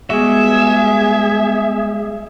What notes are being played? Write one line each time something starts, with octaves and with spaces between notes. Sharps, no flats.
G3 G#3 B3 F#4 G#4 E5